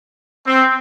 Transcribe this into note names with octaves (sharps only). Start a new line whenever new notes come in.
C4